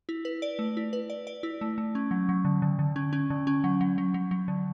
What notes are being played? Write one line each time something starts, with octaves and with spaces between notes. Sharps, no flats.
E4
B4
D5
A3
E4
B4
D5
D5
E4
A3
A3
C#4
F#3
F#3
D3
D3
D3
C#4
C#4
D3
C#4
F#3
F#3
F#3
F#3
F#3
D3